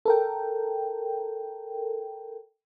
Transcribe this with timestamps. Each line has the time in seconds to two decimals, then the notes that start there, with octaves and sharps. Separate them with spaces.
0.05 A4 A#4 G5